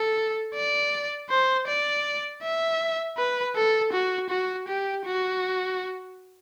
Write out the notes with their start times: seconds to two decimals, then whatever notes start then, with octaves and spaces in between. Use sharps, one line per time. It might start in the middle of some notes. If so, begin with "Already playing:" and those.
Already playing: A4
0.54 D5
1.30 C5
1.67 D5
2.42 E5
3.17 B4
3.56 A4
3.92 F#4
4.30 F#4
4.68 G4
5.05 F#4